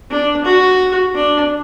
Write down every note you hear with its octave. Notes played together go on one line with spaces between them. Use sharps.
D4
F#4
D4